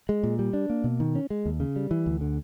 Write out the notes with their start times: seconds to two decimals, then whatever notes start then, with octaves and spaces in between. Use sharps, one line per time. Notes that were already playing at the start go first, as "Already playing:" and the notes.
0.09 G#3
0.23 A#2
0.39 G3
0.53 D4
0.70 A#3
0.84 B2
1.00 D#3
1.15 C#4
1.30 G#3
1.46 D#2
1.60 C#3
1.76 G3
1.91 E3
2.06 D2
2.21 D3